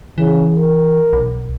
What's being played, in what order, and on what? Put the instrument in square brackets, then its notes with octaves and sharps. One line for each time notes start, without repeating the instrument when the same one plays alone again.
[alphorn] C#3 [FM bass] E3
[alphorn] A#4
[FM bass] B1